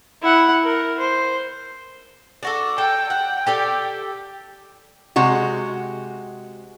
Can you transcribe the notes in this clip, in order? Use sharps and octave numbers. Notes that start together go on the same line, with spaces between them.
E4 F#5
A#4
C5
D4 F#4 A4
A4 G5
F#5 G5
G4 A4 D5
C3 G#3 F#4